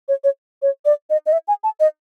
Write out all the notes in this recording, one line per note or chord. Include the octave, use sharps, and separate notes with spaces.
C#5
C#5
C#5
D5
D#5
D#5
E5
G#5
A5
D#5